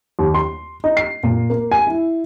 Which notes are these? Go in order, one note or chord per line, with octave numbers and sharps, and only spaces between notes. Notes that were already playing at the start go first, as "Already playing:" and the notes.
D#2
C6
D#4
C7
A#2
A#3
G#5
E4